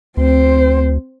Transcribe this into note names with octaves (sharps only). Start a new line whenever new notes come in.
D2 C4 C5